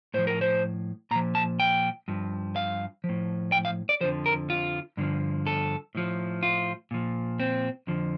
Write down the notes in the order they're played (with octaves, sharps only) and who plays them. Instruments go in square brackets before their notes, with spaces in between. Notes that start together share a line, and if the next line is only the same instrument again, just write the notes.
[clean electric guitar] A2 F3 C5
A#4
C5
A#2 A#5
F3
A5
G5
G2 F3
F5
F3
A2
G5
F5
D5
F2 D3 F3 C5
A#4
F4
G2 D3 F3
A4
A2 F3
F4
A#2 F3
C4
F2 D3 F3